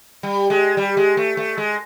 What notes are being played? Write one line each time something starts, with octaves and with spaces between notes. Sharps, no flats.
G3
G#3
G3
G#3
A3
A3
G#3